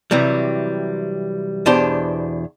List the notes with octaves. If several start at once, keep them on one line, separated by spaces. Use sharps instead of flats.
C3 E3 F#3 G3
E2 B2 D4 G4 C5